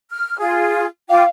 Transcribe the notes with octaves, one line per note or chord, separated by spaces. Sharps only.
F6
F4 G#4
F4 F5 G5 D6